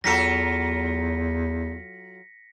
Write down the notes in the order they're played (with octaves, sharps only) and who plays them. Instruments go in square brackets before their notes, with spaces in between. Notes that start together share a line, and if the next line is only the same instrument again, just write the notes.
[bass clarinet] E2 [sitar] F#3 F4 A4 [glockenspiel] A#6 B6 C#7